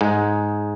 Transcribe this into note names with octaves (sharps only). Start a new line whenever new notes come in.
G#2 G#3